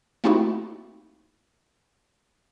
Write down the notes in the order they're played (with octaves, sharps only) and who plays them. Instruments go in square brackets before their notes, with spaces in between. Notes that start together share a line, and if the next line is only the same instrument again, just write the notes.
[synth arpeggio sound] A3 A#3 C4 D#4 E4 F#4